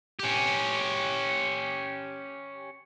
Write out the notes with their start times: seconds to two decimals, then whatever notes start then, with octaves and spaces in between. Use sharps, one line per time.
0.19 C#4 G4